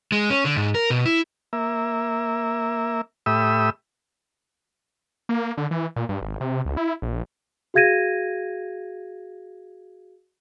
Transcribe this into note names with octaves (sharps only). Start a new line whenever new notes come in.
G#3
C#4
D3
G#2
A#4
B2
E4
A#3 E5
A2 G4 E5 B5 D#6 E6
A#3
D3
E3
A#2
G2
G#1
C3
C#2
E4
A#1
F#4 G#4 F5 G#6 A#6 D#7